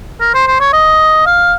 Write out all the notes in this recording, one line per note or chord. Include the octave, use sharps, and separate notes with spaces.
A#4
C5
C5
C#5
D#5
F5